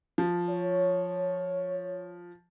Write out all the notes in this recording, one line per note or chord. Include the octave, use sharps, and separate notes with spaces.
F3
C#5